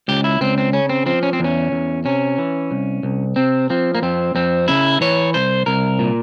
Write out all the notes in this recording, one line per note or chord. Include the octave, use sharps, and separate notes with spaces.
C#2 G4
E4
C#2 C4
C4
C#3 C#4
C4
F3 C4
C#4
C4
E2 C#4
E2
C3 C#4
E3
C2
C2
C3 C4
F3 C4
A#3
F2 C4
F2 C4
C#3 E4
E3 C#5
C2 C5
C2 A#4
A#2